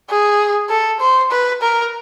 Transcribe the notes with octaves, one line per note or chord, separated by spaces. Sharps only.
G#4
A4
C5
B4
A#4